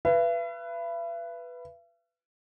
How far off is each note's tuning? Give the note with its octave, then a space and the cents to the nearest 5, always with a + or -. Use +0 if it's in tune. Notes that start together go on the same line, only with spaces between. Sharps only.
B4 +0 E5 +45